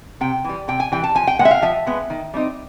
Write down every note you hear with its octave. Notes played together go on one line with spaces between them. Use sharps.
C3 G5
E3 G3
C3 G5
G#5
E3 G3 G5
A5
F3 G#5
G5
G#3 B3 F#5
E5
F5
F3 E5
G#3 B3
D#3
G3 C4 D#4